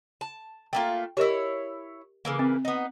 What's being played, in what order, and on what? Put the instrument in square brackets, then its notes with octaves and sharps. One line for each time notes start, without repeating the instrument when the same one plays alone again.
[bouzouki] A5
[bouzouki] A3 A#3 F4 [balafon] G5
[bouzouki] E4 C#5 [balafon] G4 A#4 D#5
[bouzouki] C#3 E3 A#3
[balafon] C4
[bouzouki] B3 D#4